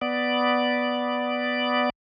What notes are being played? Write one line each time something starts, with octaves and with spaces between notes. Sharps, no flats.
B3 D5